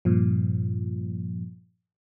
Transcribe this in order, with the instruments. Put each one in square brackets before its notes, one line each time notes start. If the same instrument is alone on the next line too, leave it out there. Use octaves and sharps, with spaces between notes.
[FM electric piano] G2 A#2 F3